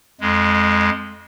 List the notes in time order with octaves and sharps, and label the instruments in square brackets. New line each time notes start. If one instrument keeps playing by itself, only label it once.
[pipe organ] F2 G#3